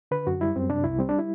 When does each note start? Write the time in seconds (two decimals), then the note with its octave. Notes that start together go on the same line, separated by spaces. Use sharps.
0.11 D3 B4
0.27 F#2 F#4
0.41 G3 E4
0.56 F#2 C4
0.69 C3 D4
0.84 C2 E4
0.99 G3 C4
1.09 D4
1.19 E4